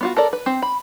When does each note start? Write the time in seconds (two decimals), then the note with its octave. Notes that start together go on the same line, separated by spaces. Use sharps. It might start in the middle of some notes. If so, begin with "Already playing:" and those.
0.01 B3 F4 F#4
0.17 A4 A#4 D5
0.33 B4
0.46 C4
0.62 B5